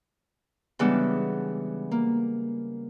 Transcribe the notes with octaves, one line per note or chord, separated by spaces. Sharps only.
C#3 E3 G3 G#3 B3 D4
A#3